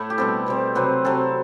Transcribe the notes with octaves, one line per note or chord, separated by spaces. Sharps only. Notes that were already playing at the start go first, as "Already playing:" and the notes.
Already playing: A2 A3 E4
G4
B2 G3 C4 A4
B2 G3 C4
C3 F#3 C4 B4
C3 F#3 C4 A4